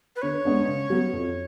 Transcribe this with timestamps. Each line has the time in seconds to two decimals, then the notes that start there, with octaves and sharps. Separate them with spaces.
0.16 B4
0.22 D3 C#5
0.45 G#3 B3 D4
0.68 C#3
0.90 F#3 B3
1.13 F2